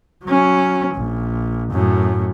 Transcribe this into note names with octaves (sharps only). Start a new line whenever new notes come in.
F#3 C#4
A#1
F#2 A2